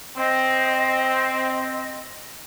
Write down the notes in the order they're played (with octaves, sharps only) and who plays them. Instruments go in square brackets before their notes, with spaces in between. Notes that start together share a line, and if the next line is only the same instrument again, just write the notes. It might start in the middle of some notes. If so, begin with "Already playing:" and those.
[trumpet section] C4 [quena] D#5